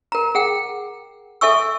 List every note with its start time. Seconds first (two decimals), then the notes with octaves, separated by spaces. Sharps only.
0.12 A#4 A#5
0.35 G#4 F#5 G5
1.41 A4 E5 G#5 C#6 E6